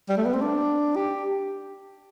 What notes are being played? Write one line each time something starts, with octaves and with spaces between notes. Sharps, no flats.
G3
A3
B3
C4
D4
G4